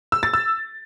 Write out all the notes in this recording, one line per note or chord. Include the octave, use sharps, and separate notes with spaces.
E6
A6
E6